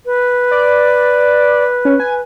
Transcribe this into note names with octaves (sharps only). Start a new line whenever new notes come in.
B4
D5
C#4
G#5